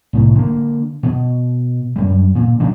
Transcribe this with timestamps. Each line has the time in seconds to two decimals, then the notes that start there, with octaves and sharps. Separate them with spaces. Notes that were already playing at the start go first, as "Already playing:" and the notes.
0.13 C2 A2
0.35 D3 A#3
1.03 B2
1.96 F#2 G3
2.35 A#2
2.60 C#3 G3 A#3 D4